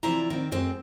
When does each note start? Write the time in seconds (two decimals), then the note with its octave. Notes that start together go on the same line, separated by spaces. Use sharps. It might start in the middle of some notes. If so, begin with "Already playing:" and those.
0.03 C3 E3 F3 E4 D5 A#5
0.30 D#3 C4
0.52 F#2 G#3 C4